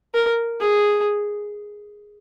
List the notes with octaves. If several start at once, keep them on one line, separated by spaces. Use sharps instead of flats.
A#4
G#4